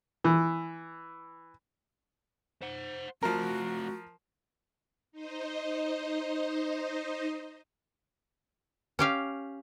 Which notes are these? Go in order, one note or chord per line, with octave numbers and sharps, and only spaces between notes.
E3
C5 F#5
F3 A3 C4 F#4 A#4
D#4 C5 D#5
C#4 G4 F5